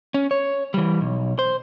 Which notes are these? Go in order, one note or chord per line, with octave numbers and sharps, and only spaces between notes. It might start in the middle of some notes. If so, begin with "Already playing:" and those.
C#4
C#5
E3 G3
B1
C5